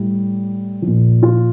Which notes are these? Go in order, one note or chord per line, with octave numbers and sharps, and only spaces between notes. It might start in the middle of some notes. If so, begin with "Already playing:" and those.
Already playing: A2 G3
F3
A#2
F4